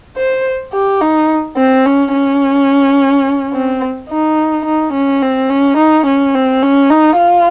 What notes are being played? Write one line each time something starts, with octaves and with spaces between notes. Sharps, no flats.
C5
G4
D#4
C4
C#4
C#4
C4
D#4
D#4
C#4
C4
C#4
D#4
C#4
C4
C#4
D#4
F4